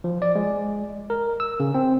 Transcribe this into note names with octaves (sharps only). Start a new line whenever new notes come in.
F3
D5
G#3
A#4
E6
C#3
C4